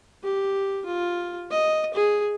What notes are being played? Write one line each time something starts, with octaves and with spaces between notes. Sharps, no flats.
G4
F4
D#5
G#4